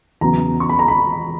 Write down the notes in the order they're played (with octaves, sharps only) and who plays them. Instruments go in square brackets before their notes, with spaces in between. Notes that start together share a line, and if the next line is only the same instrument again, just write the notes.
[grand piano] E2 C#3 F#3 B3 A#5
C#6
B5
A#5
B5